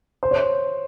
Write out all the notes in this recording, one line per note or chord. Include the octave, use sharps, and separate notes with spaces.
C5
C#5